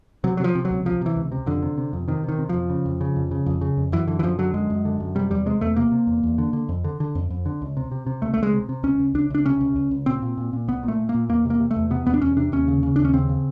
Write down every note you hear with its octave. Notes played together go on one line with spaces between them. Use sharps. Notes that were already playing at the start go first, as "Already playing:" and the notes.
C3 F#3
F#3
C3 F3
C3
F#3
C#2
C3 F3
C3 E3
C#2
C3
F2 D3
C3
C3
F2
C3 D#3
C3 D#3
C3
F2 F3
C#3
F2
C#3
F2
C#3
F2
C#3
F2
F#2 E3
D3 E3
E3
F#2 F3
D3 F#3
F#2 G#3
F#2
D3
F#2
C3 G3
E2 G3
C3 G#3
E2 A3
C3 A#3
C3
E2
E2
D3
D3
F2
D3
D3
F2
F2
D3
C#2
C3
C3
C3
C#2 A3
A3
C#2
G#3
C3
C3
C#2 C#4
C#2
C#2 D4
C#2 D4
C3 C#4
C#2
C#2
C#2
A#2 C4
A#2
A#2
A#2
C2 B3
A#2
A3
A#2
A#3
A#2
E2 A#3
C3
A#3
C3
A3
E2
C3 B3
E2 B3
D4
E2 C#4
C3 D4
D#2 C#4
C#3
C#3
D#2 D4
C#4
C#3 C4
C#3